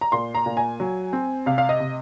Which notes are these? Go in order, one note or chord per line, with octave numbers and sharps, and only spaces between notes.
A#5
A#2 C6
A#5
A#2
G#5
F#3
C4
C3 F5
F5
D#5
C3